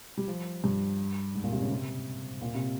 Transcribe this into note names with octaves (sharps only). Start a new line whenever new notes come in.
G3
F3
G2
G#2
A#2
C3
C#3
C3
A#2
C3